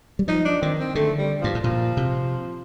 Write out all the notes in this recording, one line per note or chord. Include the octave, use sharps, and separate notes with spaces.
G3
F3 D#4
D4
D#3 C4
C4
D3 A3
G3
G2 F3
A2
A#2 F3
C3